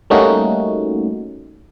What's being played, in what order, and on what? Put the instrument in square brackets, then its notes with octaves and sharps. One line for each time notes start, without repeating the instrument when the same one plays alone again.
[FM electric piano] G3 A3 A#3 C#4 D#4 F#4